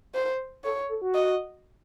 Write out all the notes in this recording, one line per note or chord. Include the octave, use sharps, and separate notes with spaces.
C5
A4 C#5
A4
F#4
D#5